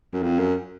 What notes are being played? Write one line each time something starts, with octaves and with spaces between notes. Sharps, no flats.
F#2
F2
F#2